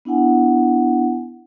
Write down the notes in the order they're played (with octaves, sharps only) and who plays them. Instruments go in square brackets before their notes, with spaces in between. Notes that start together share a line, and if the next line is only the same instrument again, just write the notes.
[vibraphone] B3 D4 E4 F#5 G#5